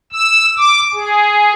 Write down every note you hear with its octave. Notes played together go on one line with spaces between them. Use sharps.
E6
D6
G#4